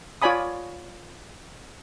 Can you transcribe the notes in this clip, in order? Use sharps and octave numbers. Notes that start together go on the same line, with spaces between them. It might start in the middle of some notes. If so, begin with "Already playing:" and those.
F4 C#5 D5 G#5 B5 D#6